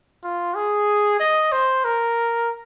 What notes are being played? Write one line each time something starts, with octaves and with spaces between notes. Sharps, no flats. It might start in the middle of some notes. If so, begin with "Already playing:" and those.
F4
G#4
D#5
C5
A#4